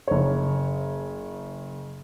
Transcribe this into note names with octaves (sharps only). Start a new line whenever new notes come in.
F#1 C#5